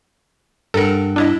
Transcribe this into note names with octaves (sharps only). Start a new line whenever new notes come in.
G2 A4 A#4 F#5
D4 E4 D#5